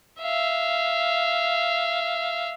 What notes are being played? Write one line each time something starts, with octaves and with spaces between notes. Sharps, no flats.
E5 F5